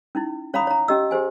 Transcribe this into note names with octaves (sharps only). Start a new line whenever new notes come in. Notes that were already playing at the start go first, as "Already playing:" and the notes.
C#4 D#4 E4
C#4 C#5 F5 A#5 B5 D#6
C#5 A#5
C#4 G4 D#5 E6
G4 G#4 C5 G#5